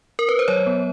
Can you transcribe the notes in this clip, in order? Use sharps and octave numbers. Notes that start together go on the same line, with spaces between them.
A#4
B4
C5
F#3 C#5
B3